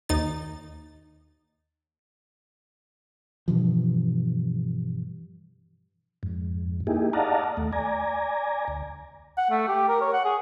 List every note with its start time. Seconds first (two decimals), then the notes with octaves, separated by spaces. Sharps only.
0.09 D#2 D#4 A6
3.48 G2 B2 E3 F3
6.23 F2 G#2
6.87 A#3 D#4 E4 G4 G#4
7.13 D5 D#5 F5 F#5 A5 A#5
7.57 D#2 A3
7.73 D5 G#5 A#5
8.68 D2
9.37 F#5
9.50 A3
9.68 G4
9.88 A#4
10.01 C#5
10.13 F#5
10.25 G#4